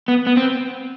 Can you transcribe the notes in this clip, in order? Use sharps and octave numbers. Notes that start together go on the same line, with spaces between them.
B3
B3
C4